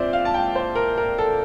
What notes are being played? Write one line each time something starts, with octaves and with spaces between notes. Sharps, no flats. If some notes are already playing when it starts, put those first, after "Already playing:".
Already playing: A#2 C4 C5 D5 E5
F5
A5
G5
C5
A#4
A#4
A4